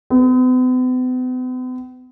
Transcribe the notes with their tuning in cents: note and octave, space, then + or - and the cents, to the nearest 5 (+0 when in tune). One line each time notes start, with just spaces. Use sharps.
B3 +45